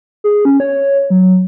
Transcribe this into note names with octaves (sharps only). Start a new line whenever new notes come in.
G#4
C#4
C#5
F#3